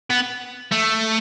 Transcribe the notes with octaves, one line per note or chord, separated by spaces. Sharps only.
B3
A3